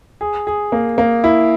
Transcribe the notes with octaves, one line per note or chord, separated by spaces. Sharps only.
G#4
G#4
A#3
A#3
E4